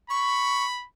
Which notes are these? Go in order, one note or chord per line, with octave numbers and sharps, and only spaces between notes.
B5 C#6